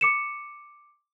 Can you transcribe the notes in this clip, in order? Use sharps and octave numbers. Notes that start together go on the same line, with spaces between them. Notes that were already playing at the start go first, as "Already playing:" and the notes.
D6 C#7 E7